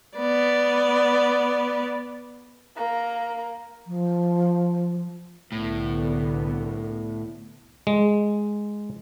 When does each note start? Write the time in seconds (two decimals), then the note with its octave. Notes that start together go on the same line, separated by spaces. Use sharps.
0.18 B3 D5
2.76 A#3 A#5
3.87 F3
5.52 C2 A2 D3 B3
7.87 G#3